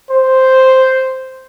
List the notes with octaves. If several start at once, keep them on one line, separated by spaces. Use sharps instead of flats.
C5